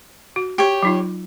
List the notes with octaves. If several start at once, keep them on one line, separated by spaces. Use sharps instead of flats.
F#4
G4 C#5
F#3 D#4 F4